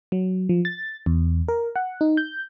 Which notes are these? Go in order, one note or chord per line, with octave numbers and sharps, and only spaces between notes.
F#3
F3
A6
E2
A#4
F#5
D#4
G6